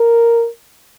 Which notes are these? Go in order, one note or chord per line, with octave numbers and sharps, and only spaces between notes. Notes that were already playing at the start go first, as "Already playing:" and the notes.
Already playing: A#4